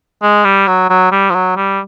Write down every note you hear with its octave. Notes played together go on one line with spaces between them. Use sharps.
G#3
G3
F#3
F#3
G3
F3
F#3
G3